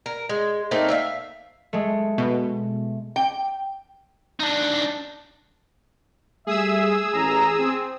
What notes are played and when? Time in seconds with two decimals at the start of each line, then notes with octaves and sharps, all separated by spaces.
0.06 A#4
0.29 G#3
0.71 A3 A#3 C4 D#4
0.90 E5 F5
1.73 G#3 A3
2.18 B2
3.16 G5
4.40 D4 D#4
6.47 G3 A3 G#4 E5 D#6 E6
7.13 A1 A#5
7.59 C4